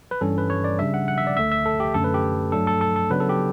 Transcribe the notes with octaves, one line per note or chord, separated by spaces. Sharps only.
B4
G2 E3 G3 C#4 A4
B4
C#5
D5
C#3 G3 D4 E5
F#5
F#5
E5
D5
D2 D3 A3 E5
E5
A4
G4
F#2 D3 A3 C#4 A4
B4
G4
G2 F#3 A3 D4 A4
A4
A4
A4
C#3 F#3 B3 D4 B4
A4
G4